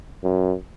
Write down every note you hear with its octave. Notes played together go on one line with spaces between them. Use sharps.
F#2